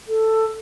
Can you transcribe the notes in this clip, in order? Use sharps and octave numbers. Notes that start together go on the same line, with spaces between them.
A4